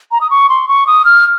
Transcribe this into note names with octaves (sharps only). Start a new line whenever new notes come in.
A#5
D#6
C#6
C6
C#6
D#6
F6